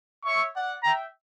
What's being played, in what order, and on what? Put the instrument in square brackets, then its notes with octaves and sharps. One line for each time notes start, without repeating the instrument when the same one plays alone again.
[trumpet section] C#5 E5 [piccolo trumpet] C#6
[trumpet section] D5 F#5
[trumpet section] E5 G5 [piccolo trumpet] A#5